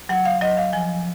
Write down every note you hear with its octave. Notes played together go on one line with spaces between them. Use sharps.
F#3 F#5
F5
F#3 D#5
F5
F3 G#5